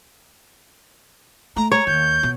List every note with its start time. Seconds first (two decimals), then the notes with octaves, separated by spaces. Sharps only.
1.56 A3 A#5
1.72 C#5 A#5
1.87 D#2 G6
2.23 B2